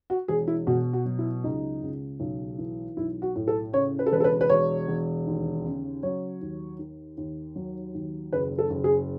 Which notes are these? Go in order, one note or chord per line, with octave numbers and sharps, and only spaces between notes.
F#4
E1 G#4
E4
B2 F#4
F#4
F#3
E4
C#2 D#4
C#2
B1
E3
B1 E4
F#4
A2
A4
C#3 C#5
B4
A4
E1 B4
A4
B4
B4
E1 C#5
E1
D#2
C#3
F#3 C#5
D#2
D#3
D#2
F#3
D#2
F#1 B4
A4
F#1
G#4